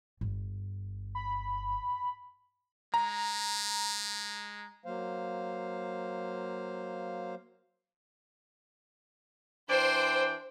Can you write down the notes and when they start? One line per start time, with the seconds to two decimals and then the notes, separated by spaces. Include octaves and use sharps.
0.21 G1
1.15 B5
2.94 G#3 A#5
4.84 F#3 A#3 C5 F5
9.69 E3 D4 C5 G5